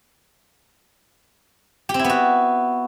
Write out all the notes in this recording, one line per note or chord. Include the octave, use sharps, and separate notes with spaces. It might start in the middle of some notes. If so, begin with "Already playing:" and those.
G4
C4
E4
B3
F#4